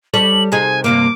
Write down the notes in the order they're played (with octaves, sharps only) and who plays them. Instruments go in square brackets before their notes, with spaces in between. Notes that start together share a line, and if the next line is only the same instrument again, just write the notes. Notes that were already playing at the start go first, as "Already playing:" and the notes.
[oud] G3 A4 C#5 [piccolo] F#7
[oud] C3 D#4 G#4 [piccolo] G#5
[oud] G2 C3 A#3 [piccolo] D6